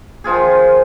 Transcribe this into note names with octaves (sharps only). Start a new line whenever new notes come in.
D#3 F3 F4 G#4